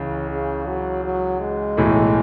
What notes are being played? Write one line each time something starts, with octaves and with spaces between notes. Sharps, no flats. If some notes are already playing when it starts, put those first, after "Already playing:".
Already playing: C#2 C#3 E3
C#3
F#3
F#3
G#3
B1 A2 E3 A3